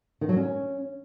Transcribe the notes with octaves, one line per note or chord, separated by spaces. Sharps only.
D#3
F#3
C#4